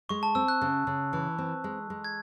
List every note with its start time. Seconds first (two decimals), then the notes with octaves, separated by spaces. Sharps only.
0.09 G#3 C#6
0.23 A5
0.35 C4 E6
0.48 F#6
0.61 C#3
0.87 C#3
1.13 E3
1.38 C4
1.64 G#3
1.90 G#3
2.04 G#6